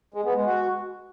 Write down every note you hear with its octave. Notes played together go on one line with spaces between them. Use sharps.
G#3
B3
G#3
F#4